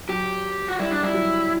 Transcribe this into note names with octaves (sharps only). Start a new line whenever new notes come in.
F#3 G4
F#4
G3 E4
G3 D4
G3 E4
F#3